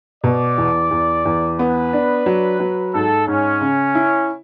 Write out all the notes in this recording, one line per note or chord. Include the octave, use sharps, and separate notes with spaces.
B2 D5
E2
E2
E2
B3 B4
D4
F#3
F#3
G#2 A4
G#2 C#4
C#3
E4